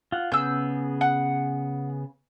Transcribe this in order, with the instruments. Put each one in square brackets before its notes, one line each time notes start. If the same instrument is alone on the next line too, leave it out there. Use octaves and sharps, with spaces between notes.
[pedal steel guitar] F4 F#5
[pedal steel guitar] C#3 B3 G#4 [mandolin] E6 G6
[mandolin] F#5